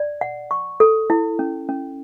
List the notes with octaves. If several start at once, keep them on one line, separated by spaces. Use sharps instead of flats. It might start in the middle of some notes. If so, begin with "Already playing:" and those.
Already playing: D5
F#5
C#6
A4
E4
C#4
C#4